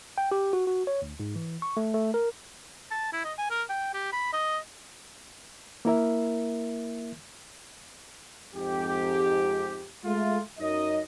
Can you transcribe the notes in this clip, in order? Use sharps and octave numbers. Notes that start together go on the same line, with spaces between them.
G5
G4
F#4
F#4
C#5
D2
G#2
E3
C#6
A3
A3
A#4
A5
E4
D#5
G#5
A#4
G5
G4
B5
D#5
A#3 E4 A#4 E5
F2 G#2 G4
G#3 A3 F4
F#2 D#4 D#5